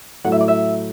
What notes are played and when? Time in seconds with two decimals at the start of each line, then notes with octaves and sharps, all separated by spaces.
0.24 A2 F#3 A3 F#5
0.32 E5
0.40 D5
0.48 E5